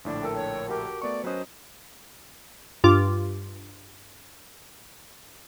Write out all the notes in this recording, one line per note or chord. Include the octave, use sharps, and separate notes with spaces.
A#1 A2 D3 D4
A4 A#4 G5
C#5
F#4 G4 A#4
A3 B3 D5 C#6
F#3 C#4 B4 C5 D#5
G2 F4 D6